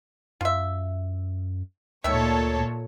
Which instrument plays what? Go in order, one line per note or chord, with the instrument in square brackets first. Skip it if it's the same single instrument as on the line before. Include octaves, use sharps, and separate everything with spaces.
[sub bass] F#2 [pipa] F4 E5
[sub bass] D2 [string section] A#2 A4 C#5 [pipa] D#3 E5